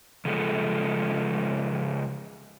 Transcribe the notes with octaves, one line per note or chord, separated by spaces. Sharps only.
C#3 F3 G#3 A4